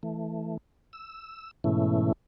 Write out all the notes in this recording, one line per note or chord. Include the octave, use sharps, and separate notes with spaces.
E3 A3
E6
G#2 B2 E3 A3 C#4 E4